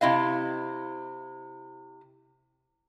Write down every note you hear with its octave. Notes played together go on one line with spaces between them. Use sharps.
C3 E4 D#5 F5